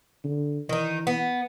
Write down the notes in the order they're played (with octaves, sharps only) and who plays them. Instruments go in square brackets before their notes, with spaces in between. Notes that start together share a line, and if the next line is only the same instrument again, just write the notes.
[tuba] D3
[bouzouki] D#3 D#4 [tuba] E3
[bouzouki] B3